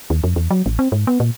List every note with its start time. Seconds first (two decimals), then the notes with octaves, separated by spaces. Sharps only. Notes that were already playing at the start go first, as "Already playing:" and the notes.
0.10 D#2
0.24 F2
0.36 E2
0.51 F#3
0.66 A1
0.79 C4
0.92 G#2
1.07 B3
1.20 A#2